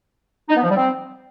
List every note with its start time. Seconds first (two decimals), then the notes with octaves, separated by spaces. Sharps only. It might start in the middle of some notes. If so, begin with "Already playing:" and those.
0.49 D#4
0.56 B3
0.63 F3
0.70 G3
0.77 C4